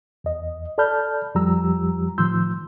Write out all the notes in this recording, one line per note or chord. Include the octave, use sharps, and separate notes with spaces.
E2 D#5
A4 D5 A5 B5 F6 G6
F2 F3 G3 G4 A#5 E6
A2 D#3 F3 C6 E6 G6